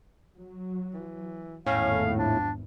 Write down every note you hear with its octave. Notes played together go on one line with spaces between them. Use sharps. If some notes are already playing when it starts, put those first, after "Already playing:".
F#3
E3
G#1 E2 A2 C#4 F5
F3 D4